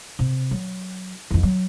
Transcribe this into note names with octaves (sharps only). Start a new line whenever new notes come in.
C3
F#3
F2 E3
F#3